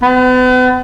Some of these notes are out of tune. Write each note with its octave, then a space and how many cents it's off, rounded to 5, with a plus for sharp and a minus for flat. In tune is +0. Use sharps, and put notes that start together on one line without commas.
B3 +40